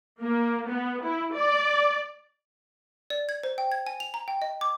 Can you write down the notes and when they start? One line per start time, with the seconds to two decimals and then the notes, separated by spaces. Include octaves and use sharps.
0.22 A#3
0.69 B3
1.04 E4
1.34 D5
3.10 D5
3.29 G#6
3.43 C5
3.58 G5
3.72 G#6
3.87 G#5
4.00 F7
4.14 A#5
4.28 G5
4.42 D#5
4.61 D6